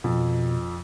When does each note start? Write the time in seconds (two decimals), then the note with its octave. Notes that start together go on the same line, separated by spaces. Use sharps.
0.04 F2 B2